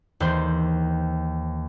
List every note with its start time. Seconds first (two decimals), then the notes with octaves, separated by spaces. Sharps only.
0.20 D#2 E3 C5